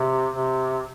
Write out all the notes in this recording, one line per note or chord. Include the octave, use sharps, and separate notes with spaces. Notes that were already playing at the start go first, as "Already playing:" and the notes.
Already playing: C3
C3